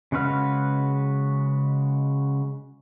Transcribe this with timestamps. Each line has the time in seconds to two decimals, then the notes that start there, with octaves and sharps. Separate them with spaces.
0.12 C#3 G#3 F#4 B4 F6